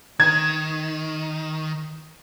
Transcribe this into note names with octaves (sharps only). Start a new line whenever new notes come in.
D#3 G#6